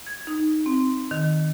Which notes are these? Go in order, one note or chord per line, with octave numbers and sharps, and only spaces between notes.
G#6
D#4
C4
D#3